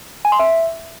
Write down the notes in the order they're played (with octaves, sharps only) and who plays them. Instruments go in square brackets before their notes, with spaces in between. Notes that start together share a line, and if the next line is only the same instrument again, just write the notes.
[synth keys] G#5
C6
E5